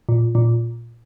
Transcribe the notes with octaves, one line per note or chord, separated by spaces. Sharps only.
A#2
A#2